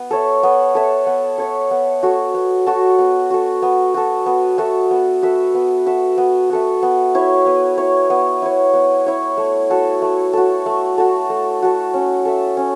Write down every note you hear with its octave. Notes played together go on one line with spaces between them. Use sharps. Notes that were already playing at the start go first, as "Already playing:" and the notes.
Already playing: B3
A4 C#5 E5
B3
A4 C#5 E5
B3
A4 C#5 E5
B3
F#4 A4
B3
F#4 A4
B3
F#4 A4
B3
F#4 A4
B3
F#4 A4 E5
B3
F#4 A4 E5
B3
F#4 A4 E5
B3
F#4 A4 E5
B3
E4 C#5
B3
E4 C#5
B3
E4 C#5
B3
E4 C#5
A3
F#4 A4
A3
F#4 A4
A3
F#4 A4
A3
F#4 A4
C#4
A4 E5
C#4